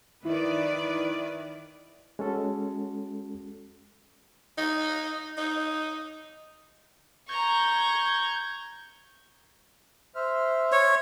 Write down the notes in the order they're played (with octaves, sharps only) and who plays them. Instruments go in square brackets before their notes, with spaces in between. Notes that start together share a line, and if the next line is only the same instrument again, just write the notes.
[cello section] D#3 B4 D5 [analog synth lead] E4
[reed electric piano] G#3 C#4 F#4 A4
[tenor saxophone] D#4
D#4
[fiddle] A#5 C#6 [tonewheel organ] G6 G#6
[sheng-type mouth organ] C5 E5 F6
[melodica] C#5